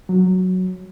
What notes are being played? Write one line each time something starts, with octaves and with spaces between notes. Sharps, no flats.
F#3